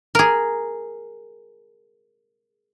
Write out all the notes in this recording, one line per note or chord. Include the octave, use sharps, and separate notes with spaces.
G#4 A#4